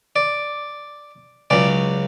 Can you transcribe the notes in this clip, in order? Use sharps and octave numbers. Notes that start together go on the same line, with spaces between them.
D5
C#2 C#3 F#3 D5